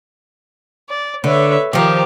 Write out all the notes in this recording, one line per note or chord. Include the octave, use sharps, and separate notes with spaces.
D5
D3 B4 C#5 E5
D#3 F3 G4 A#4